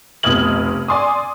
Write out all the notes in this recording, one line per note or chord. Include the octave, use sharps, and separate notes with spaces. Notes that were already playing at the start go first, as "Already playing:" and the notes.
F1 B1 D#6 F6 G#6 F#7
D5 G#5 C6 D6 D#6